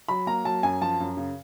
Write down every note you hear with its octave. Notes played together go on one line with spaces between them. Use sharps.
F#3 B5
A#3 A#5
F#3 A5
F#2 G#5
F3 A5
F#2
C#3